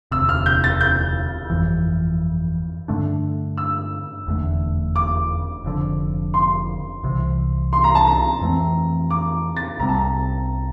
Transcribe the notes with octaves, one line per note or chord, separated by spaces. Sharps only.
E1 D2 C3 E6
F6
G6
A6
G6
G1 F2 E3
G2 D3 A3 D4
E6
F1 E2 D3 A3
D6
F1 F2 D3
C6
C2 C3 E3
C6
A#5
A5
A#5
F2 E3 A3 C4
D6
A6
C2 C3 G3 C4 A#5
A5
A#5